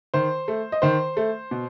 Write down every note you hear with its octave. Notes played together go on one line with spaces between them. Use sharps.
D#3 C5
A3
D#5
D#3 C5
A3
B2